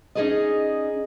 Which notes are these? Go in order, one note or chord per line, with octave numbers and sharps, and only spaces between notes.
C#4 D#4 E4 G#4 D5 D#5